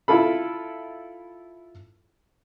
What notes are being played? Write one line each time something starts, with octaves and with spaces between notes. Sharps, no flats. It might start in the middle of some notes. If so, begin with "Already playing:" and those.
E4 F4 A4 B5